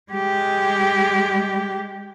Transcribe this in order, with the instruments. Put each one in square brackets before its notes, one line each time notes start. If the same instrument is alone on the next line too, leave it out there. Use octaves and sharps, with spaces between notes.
[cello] G#3 G4